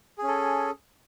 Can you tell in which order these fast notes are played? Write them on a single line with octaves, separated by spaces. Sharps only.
G#4 C#4 A4